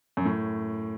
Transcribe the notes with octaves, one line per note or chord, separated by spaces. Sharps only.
F#2
A2